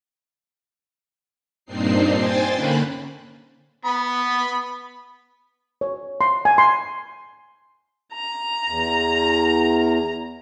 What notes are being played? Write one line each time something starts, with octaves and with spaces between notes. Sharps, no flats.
G2 A#2 C4 D4 D#4 C7
C5 G5 G#5 A6
D3 A#3 C#4 B5 F#6
B3 B5
C#5
C6
G#5
C6
A#5
E2